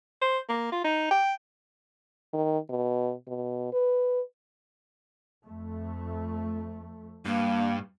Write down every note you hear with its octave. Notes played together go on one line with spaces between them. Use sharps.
C5
A#3
F4
D#4
G5
D#3
B2
B2
B4
F2 A3
G2 A#3